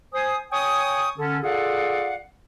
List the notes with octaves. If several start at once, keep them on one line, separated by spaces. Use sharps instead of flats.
C5 G#5 D#6
C#5 G5 G#5 C#6 D#6
D3 C#4 A4
F4 G#4 A4 D5 F5 F#5